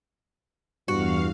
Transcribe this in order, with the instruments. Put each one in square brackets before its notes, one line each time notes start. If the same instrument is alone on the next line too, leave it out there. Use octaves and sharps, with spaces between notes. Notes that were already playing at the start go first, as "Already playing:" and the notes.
[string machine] E2 F5 [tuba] G2 [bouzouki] F#4